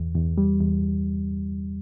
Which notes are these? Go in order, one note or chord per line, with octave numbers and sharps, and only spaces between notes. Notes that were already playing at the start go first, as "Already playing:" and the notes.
Already playing: E2
E2
G3
E2